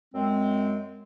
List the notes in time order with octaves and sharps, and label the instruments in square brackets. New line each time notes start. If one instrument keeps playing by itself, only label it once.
[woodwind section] F#2 G#3 C4